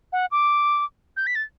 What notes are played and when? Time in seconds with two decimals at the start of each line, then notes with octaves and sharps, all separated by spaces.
0.12 F#5
0.31 D6
1.17 G6
1.27 B6
1.35 A6